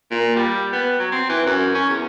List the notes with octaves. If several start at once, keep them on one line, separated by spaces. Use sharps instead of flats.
A#2
G3
B3
F#3
C4
E3
F#2
C#4
E2